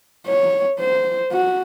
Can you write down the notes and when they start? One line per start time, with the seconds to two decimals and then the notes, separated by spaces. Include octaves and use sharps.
0.27 C#5
0.79 C5
1.32 F#4